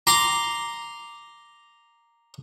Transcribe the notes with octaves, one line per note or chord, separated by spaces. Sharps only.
A#5 C6 D6